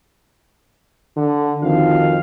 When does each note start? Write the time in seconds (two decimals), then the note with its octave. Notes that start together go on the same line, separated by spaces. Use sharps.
1.17 D3
1.63 F2 D#3 F#4 F5